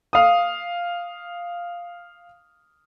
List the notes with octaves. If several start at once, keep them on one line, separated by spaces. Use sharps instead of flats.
F5 D#6